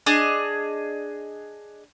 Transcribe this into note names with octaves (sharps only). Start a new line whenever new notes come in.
D4 G#4 D#5